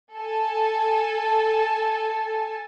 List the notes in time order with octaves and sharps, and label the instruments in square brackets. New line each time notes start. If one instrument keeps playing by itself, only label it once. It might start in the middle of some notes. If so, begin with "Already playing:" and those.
[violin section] A4 G#5 A5